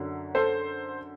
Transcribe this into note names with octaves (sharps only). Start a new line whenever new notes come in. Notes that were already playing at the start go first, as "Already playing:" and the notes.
Already playing: F#2 D3 F#3
A4 C5